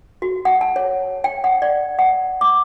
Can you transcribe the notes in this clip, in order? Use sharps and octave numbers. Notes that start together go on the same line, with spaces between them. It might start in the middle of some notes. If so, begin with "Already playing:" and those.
F#4
F#5
A5
C#5
G5
F#5
D5
F#5
D6